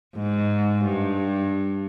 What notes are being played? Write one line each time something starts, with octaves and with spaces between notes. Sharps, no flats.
G#2
G2